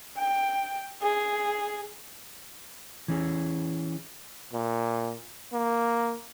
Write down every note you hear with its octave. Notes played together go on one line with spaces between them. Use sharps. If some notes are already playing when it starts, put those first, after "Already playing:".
G5
G#4
E3 C#4 G#4
A#2
A#3